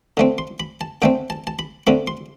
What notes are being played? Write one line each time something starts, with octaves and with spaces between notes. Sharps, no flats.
D3 A3 C4
C6
B5
A5
D3 A3 C4 G5
A5
A5
B5
D3 A3 C4 B5
C6